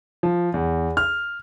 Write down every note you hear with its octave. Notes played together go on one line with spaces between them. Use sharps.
F3
E2
F6